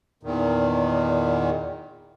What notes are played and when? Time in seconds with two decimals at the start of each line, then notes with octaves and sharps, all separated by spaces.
0.23 E2 A#2 D#3